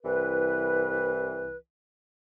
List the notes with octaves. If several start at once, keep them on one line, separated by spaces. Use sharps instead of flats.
C2 E3 B4